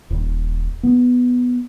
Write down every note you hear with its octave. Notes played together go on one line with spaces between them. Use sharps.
D#1
B3